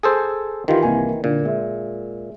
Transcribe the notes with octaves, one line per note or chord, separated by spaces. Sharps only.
G#4 A4 C5
D#3 E3 F4 G4
C2 A#3 G#5
A#2 D3
G#3 E5